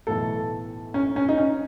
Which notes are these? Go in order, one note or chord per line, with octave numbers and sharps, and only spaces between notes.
B1 A2 E3 A4
C#4
C#4
D#4
C#4